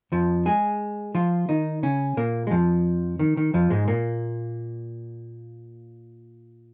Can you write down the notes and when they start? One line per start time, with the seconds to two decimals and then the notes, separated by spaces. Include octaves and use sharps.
0.12 F2 F3
0.46 G#3 G#4
1.15 F3 F4
1.49 D#3 D#4
1.83 C#3 C#4
2.17 A#2 A#3
2.47 G#3
2.51 F2 F3
3.19 D#3
3.37 D#3
3.54 F2 F3
3.70 G#2 G#3
3.88 A#2 A#3